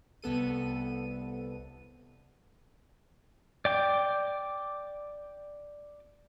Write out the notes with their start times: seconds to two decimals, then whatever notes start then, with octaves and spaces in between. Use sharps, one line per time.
0.22 C2 B3 A4 D#7
3.65 D5 G5 D6